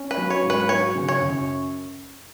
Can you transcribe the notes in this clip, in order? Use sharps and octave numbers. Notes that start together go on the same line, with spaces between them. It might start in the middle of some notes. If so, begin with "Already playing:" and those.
Already playing: C#4
B4
F#3
C#5
G#2
B4
F#3 C#5
C#3
C#5
F#2